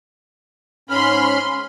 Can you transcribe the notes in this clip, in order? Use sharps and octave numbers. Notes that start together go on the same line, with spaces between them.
G#2 C#4 B5 C6 F6